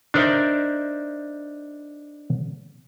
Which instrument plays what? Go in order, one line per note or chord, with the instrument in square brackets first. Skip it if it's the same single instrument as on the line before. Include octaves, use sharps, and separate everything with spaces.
[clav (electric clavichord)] D4 D#4 A#4 C5 D5 E5